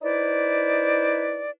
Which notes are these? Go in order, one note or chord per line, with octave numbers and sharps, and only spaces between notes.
D#4 E4 B4 C5 D5